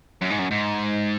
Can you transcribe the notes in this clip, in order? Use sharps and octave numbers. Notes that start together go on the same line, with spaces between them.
F#2
G#2
F#2
G#2